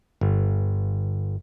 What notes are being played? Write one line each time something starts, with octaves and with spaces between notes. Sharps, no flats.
G1